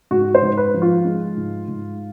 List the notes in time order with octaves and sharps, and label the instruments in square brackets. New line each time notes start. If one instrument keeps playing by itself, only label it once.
[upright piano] G#2 F#4
C5
G#2
B4
F3
F4
G#3
G#2
G#2